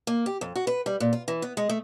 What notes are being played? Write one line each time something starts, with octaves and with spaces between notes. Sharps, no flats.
A#3
G4
F2
F#4
B4
G3
A#2
F4
E3
B3
G#3
A3